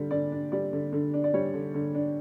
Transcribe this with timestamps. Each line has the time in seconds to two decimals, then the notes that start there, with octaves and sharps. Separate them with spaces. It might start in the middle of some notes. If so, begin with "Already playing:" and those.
Already playing: D3 G3
0.11 D3 D5
0.32 D4
0.52 G3 D5
0.73 D3
0.93 D3
1.14 D4
1.24 D5
1.34 G3 C#5
1.54 D3
1.74 D3
1.95 D4